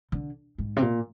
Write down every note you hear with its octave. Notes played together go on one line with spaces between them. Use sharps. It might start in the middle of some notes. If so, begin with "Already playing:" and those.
D3
G#2
C3
A#2